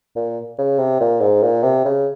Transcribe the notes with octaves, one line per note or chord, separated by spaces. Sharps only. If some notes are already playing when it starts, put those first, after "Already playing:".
A#2
C#3
C3
A#2
G#2
A#2
C3
C#3